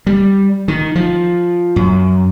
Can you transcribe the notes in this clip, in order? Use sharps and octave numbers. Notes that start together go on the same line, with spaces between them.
G3
D#3
F3
F#2